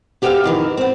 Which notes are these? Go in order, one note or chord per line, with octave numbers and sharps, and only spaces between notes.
B3 G4 A4 D5 E5 F5
F2 D#3 E3
B3 C4